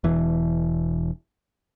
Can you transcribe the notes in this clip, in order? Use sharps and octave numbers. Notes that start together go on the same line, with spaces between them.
E1 E3